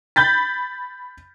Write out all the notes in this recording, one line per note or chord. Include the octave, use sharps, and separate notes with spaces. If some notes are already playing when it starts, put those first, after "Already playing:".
B5 G6 A6 B6